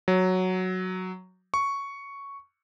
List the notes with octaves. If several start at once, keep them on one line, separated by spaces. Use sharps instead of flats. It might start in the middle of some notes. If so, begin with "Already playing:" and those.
F#3
C#6